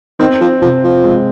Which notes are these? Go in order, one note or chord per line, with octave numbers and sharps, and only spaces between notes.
D#3 C4
F3
C3 F3
F3
G#3